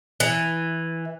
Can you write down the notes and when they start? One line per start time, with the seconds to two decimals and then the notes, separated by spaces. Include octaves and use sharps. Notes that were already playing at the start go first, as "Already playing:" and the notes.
0.20 E3